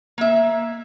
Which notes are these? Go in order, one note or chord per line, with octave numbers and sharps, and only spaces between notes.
A#3 E5